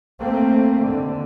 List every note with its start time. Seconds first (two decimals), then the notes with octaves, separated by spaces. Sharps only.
0.21 A3 A#3 C4
0.83 D#2 D3